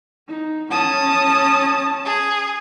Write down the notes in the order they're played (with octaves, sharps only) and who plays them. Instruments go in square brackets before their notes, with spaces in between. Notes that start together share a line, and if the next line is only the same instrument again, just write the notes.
[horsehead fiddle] D#4
[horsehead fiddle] C#4 A5 [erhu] D#6
[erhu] G#4